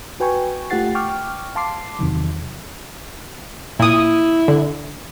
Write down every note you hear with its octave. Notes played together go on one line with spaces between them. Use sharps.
F#4 B4 G5 G#5 C#6
A3 F4 G4 F#5 A6 C7
G5 C#6 D6 F6
F5 A5 C6 D6 C7
E2 C3 D#3 F#3
A#2 E4 D#6
D3